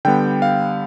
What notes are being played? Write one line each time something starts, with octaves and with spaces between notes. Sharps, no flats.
D3 G3 B3 G5
F5